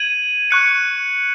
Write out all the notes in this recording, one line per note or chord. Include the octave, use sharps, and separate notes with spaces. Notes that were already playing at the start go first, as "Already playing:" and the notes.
Already playing: G#6 D#7 F#7
C#6 F#6 C#7